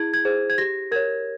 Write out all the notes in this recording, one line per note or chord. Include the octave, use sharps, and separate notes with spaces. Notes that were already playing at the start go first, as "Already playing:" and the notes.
Already playing: E4 G#4 G#6
G#6
G#4 C5
G#6
G4 A#6
A#4 C#5 G#6